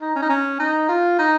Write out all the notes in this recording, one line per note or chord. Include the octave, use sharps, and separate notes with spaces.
D#4
C#4
D#4
C#4
D#4
F4
D#4